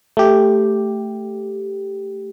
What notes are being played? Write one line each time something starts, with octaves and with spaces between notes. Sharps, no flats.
A3 G4